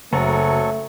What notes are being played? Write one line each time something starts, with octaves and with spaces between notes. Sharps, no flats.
F#1 F#3 A3 A4 A#5 C#6